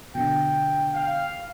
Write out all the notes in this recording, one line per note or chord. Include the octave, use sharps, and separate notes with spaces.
B2 D3 G5
F5